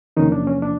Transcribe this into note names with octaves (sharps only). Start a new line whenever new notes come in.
E2 C3 D#3 F3 A#3 C#4 D#4
D4
C#4
D4